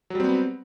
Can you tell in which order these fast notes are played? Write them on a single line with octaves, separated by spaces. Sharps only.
F#3 G3 C4 B3